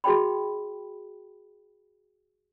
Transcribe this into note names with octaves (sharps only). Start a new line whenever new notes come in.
F#4 G#4 D#5 G5 B5